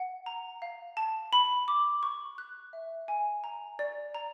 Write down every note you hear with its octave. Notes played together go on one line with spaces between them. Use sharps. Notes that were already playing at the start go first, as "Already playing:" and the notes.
Already playing: F#5
A#5
F5
A5
B5
D6
C#6
F#6
E5
G#5
A#5
D5
A#5